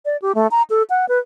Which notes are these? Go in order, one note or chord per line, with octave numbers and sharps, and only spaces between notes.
D5
G4
A3
A#5
A4
F#5
B4